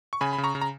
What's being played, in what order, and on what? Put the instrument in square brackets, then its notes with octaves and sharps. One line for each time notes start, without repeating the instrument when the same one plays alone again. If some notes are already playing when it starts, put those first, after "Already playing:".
[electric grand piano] C#6
C#3 G#5 B5
B5
C#3
A#5 C#6
C#3
A#5